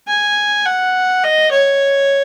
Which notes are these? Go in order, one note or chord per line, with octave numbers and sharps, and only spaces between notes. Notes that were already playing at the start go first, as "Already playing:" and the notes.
G#5
F#5
D#5
C#5